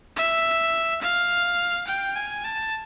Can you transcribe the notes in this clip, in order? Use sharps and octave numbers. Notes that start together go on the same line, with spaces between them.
E5
F5
G5
G#5
A5